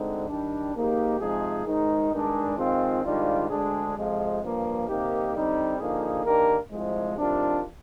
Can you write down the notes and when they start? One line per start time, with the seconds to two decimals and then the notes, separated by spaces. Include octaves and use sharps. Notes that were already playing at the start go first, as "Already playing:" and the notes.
Already playing: D2 D3 G#3 C4 D#4
0.28 D#3 G3 D4
0.74 G#2 D#3 A#3 D#4 G4
1.19 C3 F3 G#3 D#4 G#4
1.66 G#2 D#3 G#3 D#4
2.11 G2 D#3 G#3 D4 G#4
2.57 D#3 G#3 C4 F4
3.03 G#2 D#3 G3 D4 F4
3.49 D2 D3 G#3 D4 G#4
3.95 F2 C3 F3 G#3
4.41 G2 F3 A#3
4.88 C3 D#3 A#3 D#4 G4
5.33 D3 G3 C4 D#4
5.79 D3 F3 A#3 D#4 G#4
6.25 D#3 A#3 D4 G4 A#4
6.70 C2 C3 F3 G#3
7.16 C3 D#3 G3 D4 F4